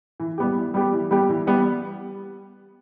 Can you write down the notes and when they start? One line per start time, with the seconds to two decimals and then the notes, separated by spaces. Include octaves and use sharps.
0.20 E3
0.38 G3 B3 G4
0.56 E3
0.74 G3 B3 G4
0.93 E3
1.11 G3 B3 G4
1.29 E3
1.47 G3 B3 G4